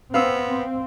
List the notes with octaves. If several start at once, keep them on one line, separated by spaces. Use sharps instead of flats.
B3 C4 F5 E6